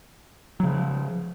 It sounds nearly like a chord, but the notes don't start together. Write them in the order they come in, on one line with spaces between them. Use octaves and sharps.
F#3 C#3 F3